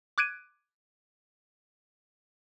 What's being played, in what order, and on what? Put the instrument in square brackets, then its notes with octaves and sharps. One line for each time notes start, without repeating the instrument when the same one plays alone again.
[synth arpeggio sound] D6 F#6 G#6 D7 D#7